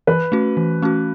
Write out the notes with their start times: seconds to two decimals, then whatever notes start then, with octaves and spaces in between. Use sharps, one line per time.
0.07 E3 B4
0.32 A3 C#4 F#4
0.57 E3
0.82 A3 C#4 F#4